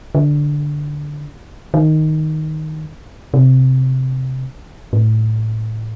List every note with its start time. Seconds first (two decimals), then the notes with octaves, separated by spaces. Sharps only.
0.15 D3
1.74 D#3
3.34 C3
4.93 A2